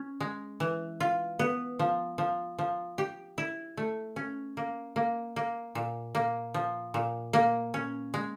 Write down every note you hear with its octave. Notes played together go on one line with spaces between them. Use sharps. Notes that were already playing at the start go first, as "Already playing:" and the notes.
Already playing: C#4
G#3
E3
F4
B3
F3
F3
F3
G4
E4
A3
C#4
A#3
A#3
A#3
A#2
A#3
F3
A#2
A#3
C#4
G#3